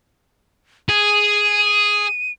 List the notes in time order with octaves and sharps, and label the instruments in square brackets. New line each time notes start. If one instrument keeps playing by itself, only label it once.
[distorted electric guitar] G#4 [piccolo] D#7